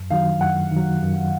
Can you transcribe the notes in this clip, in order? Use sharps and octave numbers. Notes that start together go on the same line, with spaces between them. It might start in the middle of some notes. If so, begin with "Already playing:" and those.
Already playing: F#2
D#3 F#3 F5
F#2 F#5
D#3
F#3
F#2